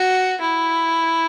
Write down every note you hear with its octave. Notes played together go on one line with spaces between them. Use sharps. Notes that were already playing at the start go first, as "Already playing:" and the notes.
Already playing: F#4
E4